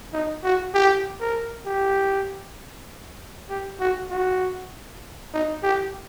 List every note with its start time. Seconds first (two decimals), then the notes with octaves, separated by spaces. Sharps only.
0.13 D#4
0.44 F#4
0.74 G4
1.21 A#4
1.66 G4
3.49 G4
3.80 F#4
4.10 F#4
5.34 D#4
5.63 G4